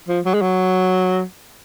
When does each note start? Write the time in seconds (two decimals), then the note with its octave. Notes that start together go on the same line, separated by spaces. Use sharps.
0.09 F3
0.26 F#3
0.34 G#3
0.42 F#3